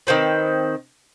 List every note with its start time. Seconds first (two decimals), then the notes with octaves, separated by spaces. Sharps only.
0.07 D#3 A#3 C4 B4